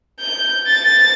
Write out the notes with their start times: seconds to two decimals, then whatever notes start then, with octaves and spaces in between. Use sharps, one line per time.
0.20 G6
0.67 A6